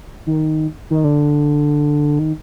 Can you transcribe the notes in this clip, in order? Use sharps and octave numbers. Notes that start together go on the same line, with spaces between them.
D#3
D#3
D3
D#3